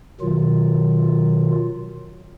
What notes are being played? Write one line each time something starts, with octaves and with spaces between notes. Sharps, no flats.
B2 D#3 F#3 F4